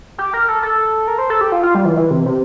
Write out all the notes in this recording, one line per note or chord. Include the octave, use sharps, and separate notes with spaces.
G4
A#4
A4
A4
A#4
C5
A4
G4
F4
F4
G3
E3
E3
C3
C3